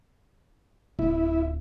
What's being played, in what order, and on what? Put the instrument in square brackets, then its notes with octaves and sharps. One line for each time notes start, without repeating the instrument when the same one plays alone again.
[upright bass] D1 [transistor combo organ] E4